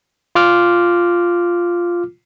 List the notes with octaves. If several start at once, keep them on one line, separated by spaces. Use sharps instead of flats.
F4 D6 F6